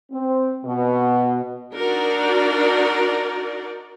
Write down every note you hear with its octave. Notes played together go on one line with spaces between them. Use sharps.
C4
B2
D4 D#4 F#4 A#4 D5